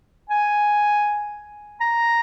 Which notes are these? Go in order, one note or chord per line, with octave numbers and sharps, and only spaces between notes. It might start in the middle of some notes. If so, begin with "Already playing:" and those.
G#5
A#5